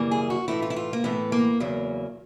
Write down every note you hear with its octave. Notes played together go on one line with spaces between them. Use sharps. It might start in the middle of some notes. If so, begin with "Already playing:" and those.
Already playing: F#2 C#3 E3 G3 A#3
G#4
F#4
A2 E3 A3 E4
F4
E4
F4
A#3
A2 E3 A3 B3
A#3
E2 C#3 F#3 A#3